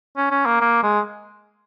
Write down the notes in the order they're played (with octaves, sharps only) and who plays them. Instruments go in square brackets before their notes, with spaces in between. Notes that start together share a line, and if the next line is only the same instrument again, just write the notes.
[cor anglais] C#4
C#4
A#3
A#3
G#3